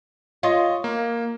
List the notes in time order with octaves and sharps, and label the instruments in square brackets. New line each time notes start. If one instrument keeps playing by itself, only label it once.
[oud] F4 [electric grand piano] C#5 D#5
[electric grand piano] A#3